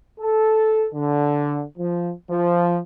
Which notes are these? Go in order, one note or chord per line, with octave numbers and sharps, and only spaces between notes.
A4
D3
F3
F3